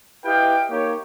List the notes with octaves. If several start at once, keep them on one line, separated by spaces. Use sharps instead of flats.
E4 G4 B4 D#5 F5 G5
A#3 D#4 G4 C#5